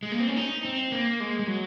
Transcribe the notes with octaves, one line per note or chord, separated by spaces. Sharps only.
G#3
A#3
C4
C#4
D#4
C4
A#3
G#3
G#3
F#3